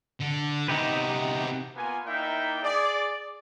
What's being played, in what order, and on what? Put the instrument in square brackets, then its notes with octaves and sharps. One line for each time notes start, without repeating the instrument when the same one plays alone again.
[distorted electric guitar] D3
[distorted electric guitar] C3 B3 [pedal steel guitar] D#4 G4 B4
[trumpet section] A#3 B3 F4 G#5
A#3 D#4 E4 D5 E5 G5
G#4 D5